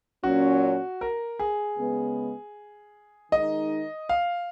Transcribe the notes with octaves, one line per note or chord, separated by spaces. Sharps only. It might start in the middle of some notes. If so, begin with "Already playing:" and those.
A#2 F#3 C#4 F#4
A#4
G#4
C#3 G#3 B3
D#3 G#3 D#4 D#5
F5